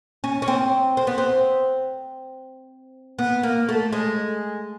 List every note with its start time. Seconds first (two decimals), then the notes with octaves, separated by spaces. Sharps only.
0.24 C#4
0.42 C#4
0.48 C4
0.97 C4
1.07 B3
1.18 C4
3.19 B3
3.43 A#3
3.69 A3
3.93 G#3